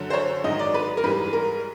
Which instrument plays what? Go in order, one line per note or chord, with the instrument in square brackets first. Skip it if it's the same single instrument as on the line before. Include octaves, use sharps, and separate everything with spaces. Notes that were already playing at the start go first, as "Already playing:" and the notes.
Already playing: [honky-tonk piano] F#2 D3 F#3
C5
C#5
G#2 D#3 F#3 D#5
D5
B4
A#4
G#2 E3 G3 B4
A#4